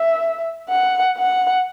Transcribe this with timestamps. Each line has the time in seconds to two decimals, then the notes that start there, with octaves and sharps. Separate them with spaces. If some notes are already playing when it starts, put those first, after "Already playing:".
Already playing: E5
0.70 F#5
1.18 F#5